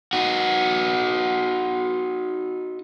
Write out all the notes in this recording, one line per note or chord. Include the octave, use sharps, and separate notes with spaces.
D#4 F#4